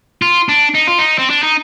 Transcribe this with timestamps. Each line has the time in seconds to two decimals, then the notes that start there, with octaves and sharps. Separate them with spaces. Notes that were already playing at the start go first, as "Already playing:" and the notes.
0.22 F4
0.49 D4
0.74 D#4
0.87 F4
0.98 D#4
1.19 C4
1.30 D4
1.43 D#4